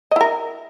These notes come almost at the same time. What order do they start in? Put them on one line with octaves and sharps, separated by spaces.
D#5 E4 A#4